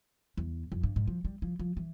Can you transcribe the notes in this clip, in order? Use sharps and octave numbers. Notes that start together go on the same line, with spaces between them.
E2
F2
G2
G#2
F3
G3
F3
F3
E3